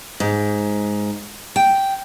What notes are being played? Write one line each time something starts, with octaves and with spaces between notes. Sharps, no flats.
G#2
G5